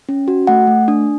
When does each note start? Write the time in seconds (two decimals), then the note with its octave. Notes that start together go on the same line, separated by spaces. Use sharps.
0.09 C#4
0.28 F#4
0.47 A3 F#5
0.67 A3
0.88 D4